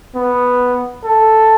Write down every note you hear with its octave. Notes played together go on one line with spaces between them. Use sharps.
B3
A4